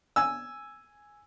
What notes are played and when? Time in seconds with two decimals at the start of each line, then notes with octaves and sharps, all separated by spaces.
0.16 G#5 E6